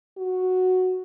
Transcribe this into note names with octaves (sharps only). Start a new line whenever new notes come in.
F#4